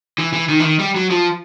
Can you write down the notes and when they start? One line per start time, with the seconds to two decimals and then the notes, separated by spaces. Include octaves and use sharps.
0.18 E3
0.33 E3
0.49 D#3
0.60 E3
0.64 D#3
0.79 G3
0.96 F#3
1.11 F3